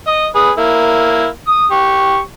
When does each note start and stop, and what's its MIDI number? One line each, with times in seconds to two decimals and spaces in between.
0.07 0.25 75
0.35 0.51 68
0.35 0.51 71
0.58 1.26 58
0.58 1.26 64
1.47 1.66 87
1.72 2.18 67
1.72 2.18 85